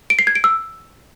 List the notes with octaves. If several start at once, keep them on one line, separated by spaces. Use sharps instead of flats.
D7
C7
G#6
D7
E6